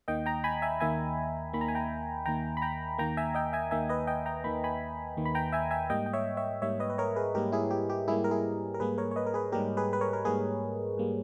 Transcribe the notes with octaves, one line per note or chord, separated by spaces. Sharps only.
D#2 D#3 A#3 D#5 G5
G5 A#5
G#5 B5
E5 G#5
D#2 D#3 A#3 E5 G#5
D#2 D#3 A#3 B5
A#5
G#5
G5 A#5
D#2 D#3 A#3 G5 A#5
B5
G5 A#5
D#2 D#3 A#3 G5 A#5
E5 G#5
D#5 G5
E5 G#5
D#2 D#3 A#3 E5 G#5
B4 D#5
D#5 G5
G5 A#5
D#2 D#3 A#3 B5
G#5 B5
D#2 D#3 A#3
B5
G5 A#5
E5 G#5
E5 G#5
G#2 G3 A#3 D#5 G5
G5
C#5 E5
C#5 E5
G#2 G3 A#3 C#5 E5
B4 D#5
B4
A#4 C#5
G#4 B4
G#2 G3 A#3 G4 A#4
E4 G#4
G4
G4
G#2 G3 A#3 E4 G#4
A#4
E4 G#4
A#4
G#2 G3 A#3 G#4 B4
A#4 C#5
C#5
B4 D#5
A#4
G#4 B4
G#2 G3 A#3 G4 A#4
G#4 B4
B4
A#4 C#5
A#4
G#2 G3 A#3 G#4 B4
G#2 G3 A#3